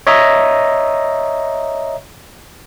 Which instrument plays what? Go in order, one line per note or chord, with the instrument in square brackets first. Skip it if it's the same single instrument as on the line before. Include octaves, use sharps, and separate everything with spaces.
[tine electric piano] C#5 D#5 E5 A#5